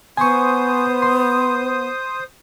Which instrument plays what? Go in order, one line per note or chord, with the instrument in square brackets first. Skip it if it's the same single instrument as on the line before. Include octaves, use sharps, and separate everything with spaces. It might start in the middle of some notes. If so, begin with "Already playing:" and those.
[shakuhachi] B3 [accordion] C5 D#6 [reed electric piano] G#5 C#6
[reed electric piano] C6